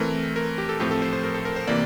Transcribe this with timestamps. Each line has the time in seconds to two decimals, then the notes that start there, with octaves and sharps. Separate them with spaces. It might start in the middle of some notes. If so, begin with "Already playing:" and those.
Already playing: E3 A3 C4 A#4
0.36 A#4
0.58 G4
0.69 A4
0.80 A2 F3 A3 C4 G4
0.91 A4
1.02 C5
1.13 C5
1.24 A#4
1.34 A4
1.45 A#4
1.56 C5
1.67 C3 E3 A#3 D5